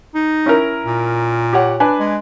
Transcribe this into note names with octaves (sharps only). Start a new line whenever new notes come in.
D#4
C#4 E4 A#4
A#2
G4 C#5 F#5
D4 B4 G#5
G#3